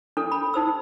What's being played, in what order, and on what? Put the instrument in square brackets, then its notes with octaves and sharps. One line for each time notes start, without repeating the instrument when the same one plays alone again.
[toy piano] D4 A4
B5
D#4 C5 E6